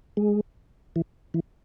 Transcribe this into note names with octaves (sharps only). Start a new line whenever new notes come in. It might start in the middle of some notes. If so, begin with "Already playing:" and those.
G#3
E3
E3